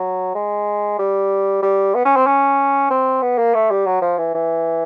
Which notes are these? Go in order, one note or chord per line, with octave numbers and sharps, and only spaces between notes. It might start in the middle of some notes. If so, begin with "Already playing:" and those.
Already playing: F#3
G#3
G3
G3
B3
C#4
C4
C#4
C4
B3
A#3
A3
G3
F#3
F3
E3
E3